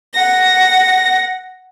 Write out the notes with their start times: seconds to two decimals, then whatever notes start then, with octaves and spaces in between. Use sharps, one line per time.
0.12 F#5 A#6